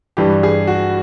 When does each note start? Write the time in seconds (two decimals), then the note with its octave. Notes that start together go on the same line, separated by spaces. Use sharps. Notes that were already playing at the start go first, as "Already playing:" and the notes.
0.17 G2 E3 G4
0.43 G#4
0.67 F#4